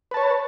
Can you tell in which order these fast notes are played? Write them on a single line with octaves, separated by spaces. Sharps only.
B4 A5 C#5